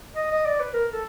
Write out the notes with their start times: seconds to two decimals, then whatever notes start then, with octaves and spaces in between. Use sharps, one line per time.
0.16 D#5
0.31 D#5
0.46 D5
0.60 B4
0.74 A#4
0.92 A4